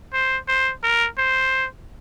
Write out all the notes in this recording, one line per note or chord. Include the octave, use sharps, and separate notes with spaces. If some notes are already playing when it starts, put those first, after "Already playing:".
C5
C5
A#4
C5